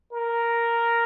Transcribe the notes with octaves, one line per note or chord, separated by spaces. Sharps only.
A#4